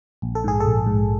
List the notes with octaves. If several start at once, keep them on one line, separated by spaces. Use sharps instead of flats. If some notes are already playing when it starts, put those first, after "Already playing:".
A#1
A4
G#2 G#4
A4
A#1
G#2